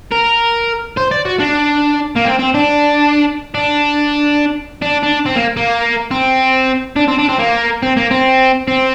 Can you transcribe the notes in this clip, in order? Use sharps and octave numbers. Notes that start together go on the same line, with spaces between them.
A#4
C5
D5
F#4
D4
A#3
C4
C4
D4
D4
D4
D4
C4
A#3
A#3
C4
D4
C4
D4
C4
A#3
C4
A#3
C4
C4